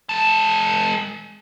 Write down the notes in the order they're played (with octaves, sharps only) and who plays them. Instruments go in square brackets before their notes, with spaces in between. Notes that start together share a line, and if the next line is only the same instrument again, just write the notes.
[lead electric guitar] G#3 A5